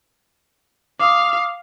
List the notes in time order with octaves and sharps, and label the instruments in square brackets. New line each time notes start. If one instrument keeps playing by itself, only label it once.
[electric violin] F5 [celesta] D6 D#6